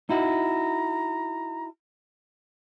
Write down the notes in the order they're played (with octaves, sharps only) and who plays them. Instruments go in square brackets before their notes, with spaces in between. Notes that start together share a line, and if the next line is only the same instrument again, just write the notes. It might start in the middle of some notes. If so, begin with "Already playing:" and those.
[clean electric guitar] D#4 E4 F#4 [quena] A#5